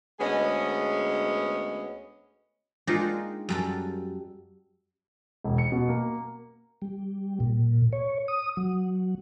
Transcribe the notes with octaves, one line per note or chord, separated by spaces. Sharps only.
D2 G#3 B3 C#4 G#4 D#5
G#3 A#3 C4 D4 D#4 F4
F#2 G3 A4
E1
C#7
B2
A#3
G3
A#2
C#5
D#6
F#3